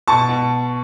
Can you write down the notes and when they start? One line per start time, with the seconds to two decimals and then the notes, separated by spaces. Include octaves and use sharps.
0.08 B2 A5 C#6
0.29 B2